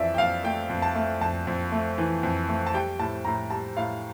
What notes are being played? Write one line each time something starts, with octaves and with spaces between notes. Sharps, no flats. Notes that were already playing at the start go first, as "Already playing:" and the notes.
Already playing: F2 E3 D5 E5
G5
F2 F5
A3 G5
F2
A5
A3
F2 A5
F2
A3
E3
F2
A3
A5
G3 G5
A2 A5
A2 A#5
G3 A5
A2 F5